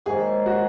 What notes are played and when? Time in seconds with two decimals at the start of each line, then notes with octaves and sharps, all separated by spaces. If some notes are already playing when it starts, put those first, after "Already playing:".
0.06 G#2 D#3 F#3 A#3 G#4
0.46 F#4